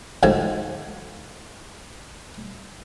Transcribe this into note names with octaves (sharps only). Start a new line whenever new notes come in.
D2 G#2 F3 G#5 A5